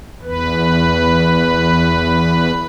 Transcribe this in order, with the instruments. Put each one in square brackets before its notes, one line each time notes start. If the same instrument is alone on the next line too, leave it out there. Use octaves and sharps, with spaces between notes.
[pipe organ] E2 B4